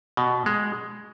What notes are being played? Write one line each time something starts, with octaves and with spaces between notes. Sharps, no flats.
B2
G#3